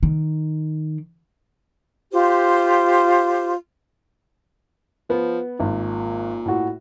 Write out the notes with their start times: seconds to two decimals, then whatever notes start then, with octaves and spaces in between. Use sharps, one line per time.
0.03 D#3
2.13 F4 G4 C5
5.10 F3 B3
5.60 G#1 A#2
6.46 A2 F#4